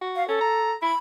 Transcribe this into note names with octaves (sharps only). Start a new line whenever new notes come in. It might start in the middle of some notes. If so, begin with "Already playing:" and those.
F#4
F5
C#4 A4
A#5
E4 B5